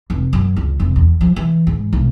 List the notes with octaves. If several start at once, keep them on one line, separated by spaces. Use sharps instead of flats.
F1
F#2
C#2
F1
E2
F3
E3
G#2
B1